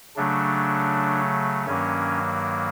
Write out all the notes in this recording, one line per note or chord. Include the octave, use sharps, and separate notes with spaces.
C#3 F#3 A3 D4
G2 D#3 F#3 A#3 C#4